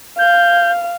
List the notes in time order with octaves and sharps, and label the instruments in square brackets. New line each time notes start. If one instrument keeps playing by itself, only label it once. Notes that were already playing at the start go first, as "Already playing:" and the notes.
[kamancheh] F5 [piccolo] G6